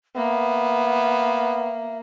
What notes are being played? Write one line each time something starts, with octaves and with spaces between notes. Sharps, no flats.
A#3 B3 E5